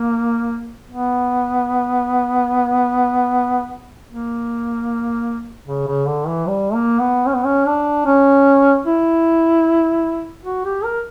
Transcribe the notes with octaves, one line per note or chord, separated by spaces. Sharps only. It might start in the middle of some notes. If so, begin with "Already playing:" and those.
Already playing: A#3
B3
A#3
C#3
C#3
D3
E3
G3
A#3
B3
C#4
B3
C#4
D4
C#4
E4
F#4
G4
A#4